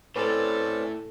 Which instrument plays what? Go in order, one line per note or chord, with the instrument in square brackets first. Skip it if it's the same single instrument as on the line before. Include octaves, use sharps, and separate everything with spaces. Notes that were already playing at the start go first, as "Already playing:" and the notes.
[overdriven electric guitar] A2 [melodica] C4 C#4 D5 [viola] A4 [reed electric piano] B4